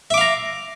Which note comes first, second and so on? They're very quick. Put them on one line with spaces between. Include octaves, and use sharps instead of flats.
E5 D6 F5 A#5